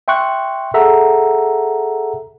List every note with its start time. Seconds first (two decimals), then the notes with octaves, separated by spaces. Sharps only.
0.08 E5 G5 C6 C#6 F#6
0.74 G#4 A4 E5 F#5 A#5